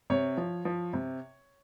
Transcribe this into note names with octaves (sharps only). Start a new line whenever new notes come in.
C3 C#5
F3
F3
C3